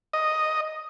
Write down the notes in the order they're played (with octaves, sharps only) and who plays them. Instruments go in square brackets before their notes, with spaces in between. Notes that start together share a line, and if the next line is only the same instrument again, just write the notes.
[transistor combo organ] D#5